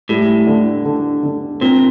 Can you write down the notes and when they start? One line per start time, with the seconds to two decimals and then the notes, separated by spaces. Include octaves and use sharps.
0.09 A2 G3
0.47 D3
0.85 D3
1.23 D3
1.61 A#2 C4